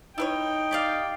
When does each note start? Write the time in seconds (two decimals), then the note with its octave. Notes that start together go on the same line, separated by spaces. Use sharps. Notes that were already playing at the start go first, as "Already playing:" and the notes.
0.18 D#4 E4 B4 C#5 G5
0.71 G4 D5 F5